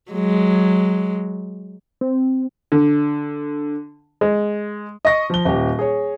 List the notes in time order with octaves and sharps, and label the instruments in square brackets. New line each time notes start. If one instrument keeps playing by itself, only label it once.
[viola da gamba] F#3 G#3
[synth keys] C4
[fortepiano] D3
G#3
[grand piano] D#5 C#6 A#6
F3 G7
D#1 G4
G#4 C#5